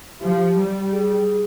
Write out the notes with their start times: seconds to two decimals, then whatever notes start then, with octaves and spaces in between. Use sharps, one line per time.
0.21 F3 G4
0.57 G3
0.92 G#4